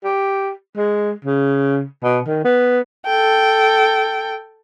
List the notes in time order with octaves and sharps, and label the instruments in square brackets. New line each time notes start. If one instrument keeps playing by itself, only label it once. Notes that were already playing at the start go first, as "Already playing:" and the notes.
[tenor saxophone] G4
G#3
C#3
B2
D#3
B3
[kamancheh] A4 G5